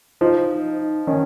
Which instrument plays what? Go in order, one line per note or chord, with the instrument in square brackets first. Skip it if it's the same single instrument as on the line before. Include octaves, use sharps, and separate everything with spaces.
[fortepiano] F3 [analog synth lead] D#4
[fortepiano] D#3 [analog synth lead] C#4